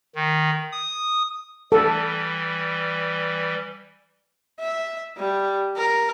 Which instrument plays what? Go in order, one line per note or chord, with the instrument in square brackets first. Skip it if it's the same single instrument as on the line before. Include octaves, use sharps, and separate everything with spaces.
[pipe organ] D#3
D#6
[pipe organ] E3 G3 [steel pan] A4
[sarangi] E5
G3
A#4